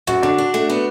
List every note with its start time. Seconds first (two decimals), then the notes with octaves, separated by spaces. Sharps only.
0.07 F#2 F#4
0.23 D3 D4
0.38 D4
0.54 A3
0.70 B3